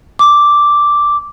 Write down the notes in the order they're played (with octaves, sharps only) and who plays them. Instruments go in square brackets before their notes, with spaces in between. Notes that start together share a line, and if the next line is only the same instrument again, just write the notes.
[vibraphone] D6